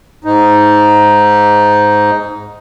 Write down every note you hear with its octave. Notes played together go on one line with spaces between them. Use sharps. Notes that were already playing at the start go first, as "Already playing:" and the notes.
G#2 D#4